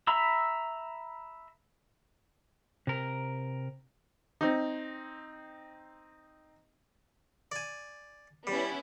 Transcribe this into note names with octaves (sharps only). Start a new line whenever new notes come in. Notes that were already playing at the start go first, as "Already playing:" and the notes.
E5 A#5 B5 E6
C3 A#4
C4 D#4
D5 G#5
G3 B3 C#4 E4